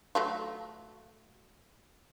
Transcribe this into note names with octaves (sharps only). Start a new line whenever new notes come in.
F#3 A3 F4